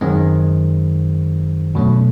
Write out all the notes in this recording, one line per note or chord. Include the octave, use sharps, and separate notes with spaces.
F#2 D#3 G#3 C4
E2 B2 F#3 A3 C#4